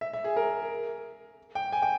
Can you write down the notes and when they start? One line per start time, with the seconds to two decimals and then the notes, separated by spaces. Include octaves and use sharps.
0.01 E5
0.13 E5
0.24 G#4
0.37 A#4
1.55 G5
1.72 G#5
1.82 G5